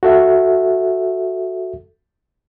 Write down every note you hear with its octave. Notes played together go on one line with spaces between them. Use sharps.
F#4 A4 E5